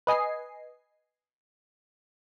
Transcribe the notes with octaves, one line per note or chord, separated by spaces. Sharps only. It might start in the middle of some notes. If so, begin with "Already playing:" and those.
B4 D#5 G#5 C7